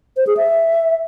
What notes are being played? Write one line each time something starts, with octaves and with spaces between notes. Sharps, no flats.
C5
G#4
E5